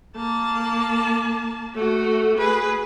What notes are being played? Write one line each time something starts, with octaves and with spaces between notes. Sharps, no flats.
A#3 A5
A3 F#4
G#4 B4